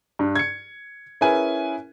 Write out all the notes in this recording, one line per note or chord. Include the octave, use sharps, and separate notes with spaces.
G2
G#6 C#7
C#4 E4 G#4 A#4 B4 G#5